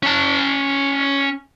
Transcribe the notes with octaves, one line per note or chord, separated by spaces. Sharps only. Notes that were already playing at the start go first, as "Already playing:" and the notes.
C#4 A5